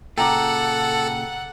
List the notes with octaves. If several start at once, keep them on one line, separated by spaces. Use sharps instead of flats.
A#2 C#3 A4 F#5 G5 A#5 D6